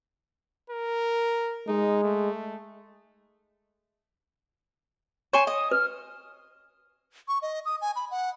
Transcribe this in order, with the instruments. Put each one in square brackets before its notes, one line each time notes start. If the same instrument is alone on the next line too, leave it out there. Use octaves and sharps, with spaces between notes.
[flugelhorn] A#4
[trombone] G#3 [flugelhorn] D#4
[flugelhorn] A3
[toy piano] C#5 [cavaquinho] G#5 C6 C#6 [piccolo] E7
[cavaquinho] D#5 [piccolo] D#6
[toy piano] B4 [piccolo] F6
[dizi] C#6
D#5
D#6
G#5
B5
F#5